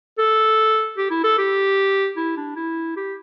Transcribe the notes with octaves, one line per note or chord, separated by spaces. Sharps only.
A4
G4
E4
A4
G4
E4
D4
E4
G4